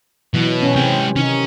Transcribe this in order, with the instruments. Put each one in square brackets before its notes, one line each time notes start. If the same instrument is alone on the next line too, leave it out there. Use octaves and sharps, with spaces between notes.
[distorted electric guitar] B2 [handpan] E3 F#3
[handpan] C#4
[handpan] C3 C4 [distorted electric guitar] G#3 G5
[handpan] C3 D#3 D#4 [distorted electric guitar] C#4